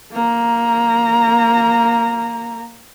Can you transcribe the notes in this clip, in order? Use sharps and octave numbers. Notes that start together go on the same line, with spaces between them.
A#3 A#5